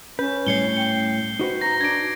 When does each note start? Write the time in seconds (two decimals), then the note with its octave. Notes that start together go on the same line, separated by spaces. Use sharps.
0.19 C#4 B4 G6
0.47 A2 G3 C#5 C7 C#7 G7
0.77 G5 C#7
1.39 D#4 F#4 B4 C5
1.61 A#5 A#6
1.81 D4 G#6 D7